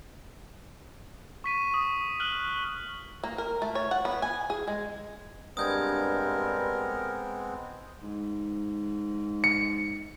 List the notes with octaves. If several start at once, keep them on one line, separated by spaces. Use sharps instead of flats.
C#6 B6 D#7
C#6 D#6
F6 F#6 F#7
A#3
A#4
A3
C#5
F#5
B3
G#5
G#4
G#3
G2 G#3 B3 C4 A#4 D#6 G6 G#6
G#2
C#7